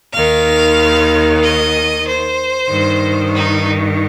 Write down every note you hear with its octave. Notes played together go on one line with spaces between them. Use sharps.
D#2 D#3 F5
D#5
C5
G2 D#3
D#4